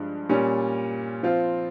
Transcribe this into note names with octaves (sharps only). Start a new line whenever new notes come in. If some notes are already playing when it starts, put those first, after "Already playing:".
Already playing: G2 F3 G#3
A#2 G3 C#4
F3 C4 F4